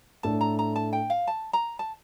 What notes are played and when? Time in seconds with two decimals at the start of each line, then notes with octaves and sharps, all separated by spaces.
0.23 A2 A3 D4 A4 A5
0.41 A#5
0.59 A#5
0.76 A5
0.93 G5
1.10 F5
1.27 A5
1.53 A#5
1.79 A5